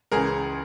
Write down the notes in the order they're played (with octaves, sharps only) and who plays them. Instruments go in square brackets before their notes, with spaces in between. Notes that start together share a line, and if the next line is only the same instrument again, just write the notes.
[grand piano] C#2 C#3 E3 G#4 A#4